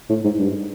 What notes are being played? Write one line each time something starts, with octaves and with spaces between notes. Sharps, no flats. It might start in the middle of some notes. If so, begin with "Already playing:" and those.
A2
G#2
G2